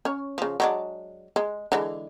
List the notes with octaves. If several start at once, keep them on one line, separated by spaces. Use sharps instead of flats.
C#4 C#5
C#3 F3
F#3 G#3 D4
G#3
D3 E3 G#3